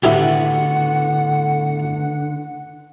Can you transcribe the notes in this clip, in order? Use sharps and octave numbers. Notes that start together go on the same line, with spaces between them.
A2 D3 B3 D#4 E4 F#4 G4 F#5